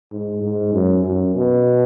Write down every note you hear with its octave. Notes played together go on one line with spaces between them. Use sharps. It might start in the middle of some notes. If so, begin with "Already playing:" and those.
G#2
G#2
F#2
F#2
B2